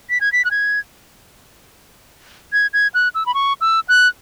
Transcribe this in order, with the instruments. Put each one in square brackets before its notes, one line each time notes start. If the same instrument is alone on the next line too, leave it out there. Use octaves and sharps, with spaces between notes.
[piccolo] B6
G#6
B6
F#6
G#6
G#6
G#6
F#6
E6
B5
C#6
E6
F#6